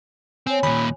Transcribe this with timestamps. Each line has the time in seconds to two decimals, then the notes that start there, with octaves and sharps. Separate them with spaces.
0.47 C4 C#5 G#5
0.63 D#2 A#2 B5